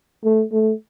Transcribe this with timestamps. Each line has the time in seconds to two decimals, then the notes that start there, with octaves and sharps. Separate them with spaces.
0.24 A3
0.52 A3